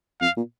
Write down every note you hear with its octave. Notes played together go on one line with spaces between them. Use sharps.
F2 F5
A#2